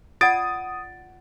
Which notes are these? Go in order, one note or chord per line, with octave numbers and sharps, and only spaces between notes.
F4 D5 F#5 D#6 A6 D7